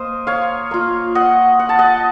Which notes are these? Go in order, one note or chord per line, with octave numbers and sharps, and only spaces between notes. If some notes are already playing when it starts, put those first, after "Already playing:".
Already playing: A#3 A#4 C5 D#5
C#5 F5
A#3 F4
D#5 F#5
F#5
A5
D#5 F#5